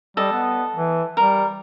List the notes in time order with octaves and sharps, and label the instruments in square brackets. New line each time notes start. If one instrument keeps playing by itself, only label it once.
[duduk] G3 [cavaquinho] A4 D#5
[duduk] B3
E3
[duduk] G3 [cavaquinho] A#4